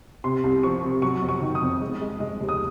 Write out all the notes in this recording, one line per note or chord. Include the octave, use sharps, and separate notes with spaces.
C3 C6
C2
F3 C#6
C3
F#3 C#6
F2
C#6
D#3
D#6
F2
G#3
G#3
G#3
D#2
D#6